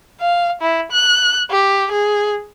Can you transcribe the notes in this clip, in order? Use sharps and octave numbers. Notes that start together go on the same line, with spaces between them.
F5
E4
F#6
G4
G#4